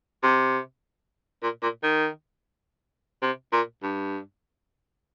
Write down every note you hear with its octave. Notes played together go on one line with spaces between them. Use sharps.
C3
A#2
A#2
D#3
C3
A#2
G2